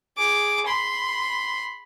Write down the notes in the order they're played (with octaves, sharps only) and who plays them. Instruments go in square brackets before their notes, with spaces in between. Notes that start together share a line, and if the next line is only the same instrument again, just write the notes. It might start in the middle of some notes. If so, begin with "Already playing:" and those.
[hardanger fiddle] G#4 D6
B5 C6